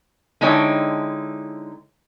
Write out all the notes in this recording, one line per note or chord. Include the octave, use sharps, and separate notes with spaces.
D3 G#3 D#4 E4 C#5 G5